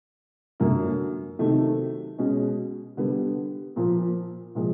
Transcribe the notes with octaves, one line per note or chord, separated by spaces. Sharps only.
F#2 D3 F#3 A#3
C3 D#3 F#3 A3
B2 G#3 C#4
D3 G3 B3
A#2 F3 A#3
A#2 F3 G#3